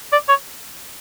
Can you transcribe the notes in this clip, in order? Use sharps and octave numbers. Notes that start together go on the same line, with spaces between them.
D5
C#5